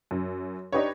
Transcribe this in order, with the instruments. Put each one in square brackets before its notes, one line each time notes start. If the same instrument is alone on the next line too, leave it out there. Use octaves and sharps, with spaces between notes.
[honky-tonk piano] F#2
D4 D#4 G4 B4 C#5